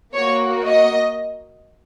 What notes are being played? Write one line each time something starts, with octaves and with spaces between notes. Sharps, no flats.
A#3 F#4 C#5
D#5